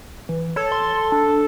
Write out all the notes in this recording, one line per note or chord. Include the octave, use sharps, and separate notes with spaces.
E3
A4 C#5
C6
D4